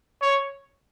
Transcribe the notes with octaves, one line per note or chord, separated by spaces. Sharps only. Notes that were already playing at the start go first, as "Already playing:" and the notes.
C#5